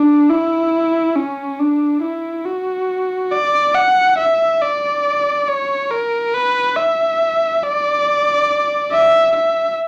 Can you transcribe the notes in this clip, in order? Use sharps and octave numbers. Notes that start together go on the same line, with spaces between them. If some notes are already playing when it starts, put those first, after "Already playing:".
Already playing: D4
E4
C#4
D4
E4
F#4
D5
F#5
E5
D5
C#5
A#4
B4
E5
D5
E5
E5